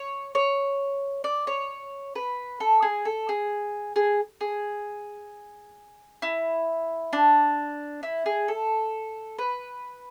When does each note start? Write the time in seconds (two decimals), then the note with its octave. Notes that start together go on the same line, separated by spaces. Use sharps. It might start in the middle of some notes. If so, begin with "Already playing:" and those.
Already playing: C#5
0.35 C#5
1.24 D5
1.47 C#5
2.16 B4
2.60 A4
2.82 G#4
3.05 A4
3.29 G#4
3.96 G#4
4.41 G#4
6.22 E4
7.13 D4
8.03 E4
8.26 G#4
8.48 A4
9.39 B4